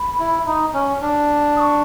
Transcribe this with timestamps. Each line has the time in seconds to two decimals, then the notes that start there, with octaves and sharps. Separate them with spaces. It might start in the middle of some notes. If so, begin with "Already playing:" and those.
Already playing: B5
0.19 E4
0.47 D#4
0.74 C#4
1.02 D4
1.57 D#6
1.60 C#6